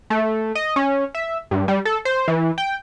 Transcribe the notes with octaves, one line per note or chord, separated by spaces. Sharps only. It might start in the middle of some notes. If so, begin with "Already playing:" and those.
A3
D#5
C#4
E5
G2
G3
A4
C5
E3
G5